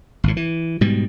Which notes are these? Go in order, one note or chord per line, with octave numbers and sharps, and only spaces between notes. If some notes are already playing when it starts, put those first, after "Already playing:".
G#1 A2
E3
G#2 B2 G3